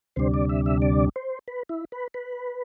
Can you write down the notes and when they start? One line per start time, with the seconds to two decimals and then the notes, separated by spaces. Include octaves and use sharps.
0.16 D2 C3 G3 D4 C5
0.34 D5
0.49 E5
0.66 E5
0.82 D5
1.16 C5
1.48 B4
1.69 E4
1.92 B4
2.14 B4